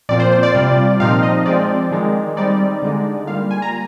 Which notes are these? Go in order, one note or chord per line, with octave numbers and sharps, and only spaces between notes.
A#2 F3 C4 F4 D5
C5
C5
D5
C3 G3 C4 F4
A#2 F3 C4 D#4 F5
D#5
F3 G#3 C4 D5
D#3 G#3 D#4
G3 C4 D#4 D5
D3 G#3 D#4
G3 A#3 F4 F5
G#5
A#5